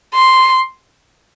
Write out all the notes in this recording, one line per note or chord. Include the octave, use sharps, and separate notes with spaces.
C6